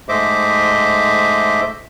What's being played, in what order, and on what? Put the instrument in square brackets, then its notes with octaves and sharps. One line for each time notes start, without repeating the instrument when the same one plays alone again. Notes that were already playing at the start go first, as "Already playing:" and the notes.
[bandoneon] G#2 A3 C5 D#5 E5 D6